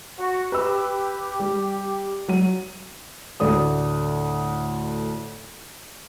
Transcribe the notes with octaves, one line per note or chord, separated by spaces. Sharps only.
F#4
G4 B4 E6
G3
F#3 D#7
D2 A2 D5 D#6